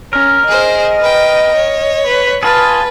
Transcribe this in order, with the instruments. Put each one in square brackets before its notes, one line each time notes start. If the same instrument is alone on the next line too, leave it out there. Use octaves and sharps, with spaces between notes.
[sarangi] C#4 [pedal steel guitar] A#4
[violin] G#4 C5 [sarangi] D#5
[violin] B4 G5
C#5
[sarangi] B4
[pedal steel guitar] F4 G#4 [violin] B4 [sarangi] A5